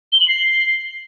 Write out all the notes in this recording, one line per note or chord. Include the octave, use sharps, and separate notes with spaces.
G7
F#7
C7